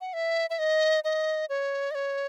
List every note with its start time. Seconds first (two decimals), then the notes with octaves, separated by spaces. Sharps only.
0.01 F#5
0.13 E5
0.50 E5
0.59 D#5
1.04 D#5
1.49 C#5
1.91 D#5
1.95 C#5